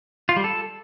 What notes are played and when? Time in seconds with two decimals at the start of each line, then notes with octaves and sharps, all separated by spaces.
0.29 F4
0.36 G3
0.44 A4